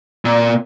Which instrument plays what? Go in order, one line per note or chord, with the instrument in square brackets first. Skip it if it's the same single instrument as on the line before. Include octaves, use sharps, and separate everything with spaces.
[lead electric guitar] A#2